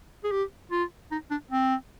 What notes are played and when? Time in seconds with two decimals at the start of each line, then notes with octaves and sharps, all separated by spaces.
0.24 G#4
0.31 G4
0.71 F4
1.11 D#4
1.30 D4
1.51 C4